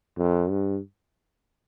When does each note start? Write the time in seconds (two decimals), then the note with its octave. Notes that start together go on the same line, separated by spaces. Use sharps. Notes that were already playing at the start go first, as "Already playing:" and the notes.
0.18 F2
0.50 G2